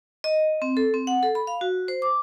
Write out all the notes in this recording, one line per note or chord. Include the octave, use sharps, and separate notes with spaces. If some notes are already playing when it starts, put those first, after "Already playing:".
D#5
C4
A4
C4
F#5
A4
B5
F5
F#4
C5
D6